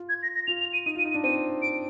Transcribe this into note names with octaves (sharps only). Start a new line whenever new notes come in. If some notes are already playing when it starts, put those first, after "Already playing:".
Already playing: F4
G#6
A#6
A#6
F4 F7
F7
D#7
D#4 D#7
F4
D#7
D#4
D#7
D4
C4 D#7
D7